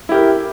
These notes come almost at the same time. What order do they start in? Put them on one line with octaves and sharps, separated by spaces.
E4 G4 A#4